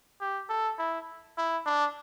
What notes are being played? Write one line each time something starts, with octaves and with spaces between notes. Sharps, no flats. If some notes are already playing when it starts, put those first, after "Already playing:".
G4
A4
E4
E4
D4